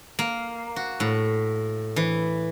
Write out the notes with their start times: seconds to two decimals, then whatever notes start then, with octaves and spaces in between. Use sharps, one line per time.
0.19 A#3
0.76 F#4
1.00 A2
1.96 E3